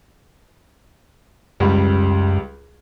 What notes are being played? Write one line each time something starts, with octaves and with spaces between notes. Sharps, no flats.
C#2 F#2 G3